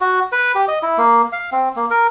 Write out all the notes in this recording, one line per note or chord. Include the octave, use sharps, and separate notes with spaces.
F#4
B4
G4
D#5
E4
A#3
F5
C4
A#3
A#4